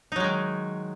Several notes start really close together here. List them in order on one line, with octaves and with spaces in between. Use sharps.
D#4 F#3 G#3 D#3